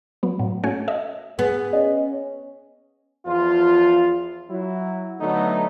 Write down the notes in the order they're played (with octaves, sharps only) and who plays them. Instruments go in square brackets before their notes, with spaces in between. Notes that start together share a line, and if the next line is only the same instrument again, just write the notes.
[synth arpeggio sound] F#3 B3
A2 F#3
A3 C#4 F#4 C#5 G#5
A4 D#5 E5
[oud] B3 [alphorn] G#4
[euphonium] C#4 [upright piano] D#5
[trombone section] E2 F3 F4
F#3 E4
D3 F#3 A3 B3 D#4